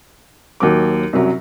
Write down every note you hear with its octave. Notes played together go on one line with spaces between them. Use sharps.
D#2 F#3 D6
C2 F#2 F#3